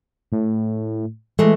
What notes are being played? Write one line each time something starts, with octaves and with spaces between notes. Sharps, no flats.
A2
E3 G#3 A3